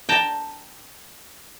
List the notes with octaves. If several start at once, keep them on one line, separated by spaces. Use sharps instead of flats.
G5 A5 A#5